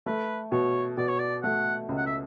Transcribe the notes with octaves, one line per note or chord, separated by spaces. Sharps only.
A3 B4
B2 C#5
B2 D5
C#5
D5
A3 F#5
C#2
F#5
E5